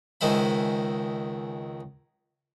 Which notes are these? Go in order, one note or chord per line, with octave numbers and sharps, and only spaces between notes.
C#2 D#3 G#3 C5 E5 B5